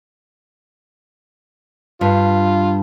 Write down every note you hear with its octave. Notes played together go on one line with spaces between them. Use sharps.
G2 F4